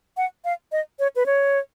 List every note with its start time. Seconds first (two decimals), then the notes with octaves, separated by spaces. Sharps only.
0.17 F#5
0.45 F5
0.72 D#5
0.99 C#5
1.16 B4
1.26 C#5